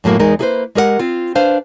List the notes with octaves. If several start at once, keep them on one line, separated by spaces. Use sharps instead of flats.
F#2 A2 F#3 A#3
E2 G#3 D#4 A#4
A#3 E4 G#4 A4 B4 C5
G#3 G4 A#4 C#5 F#5
C4 F4
D4 B4 C5 F5